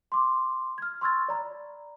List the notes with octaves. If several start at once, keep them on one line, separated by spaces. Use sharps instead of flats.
C6 D6
F6 G#6
C6 C#6 E6 F6 G#6 A6
D5 A#5 B5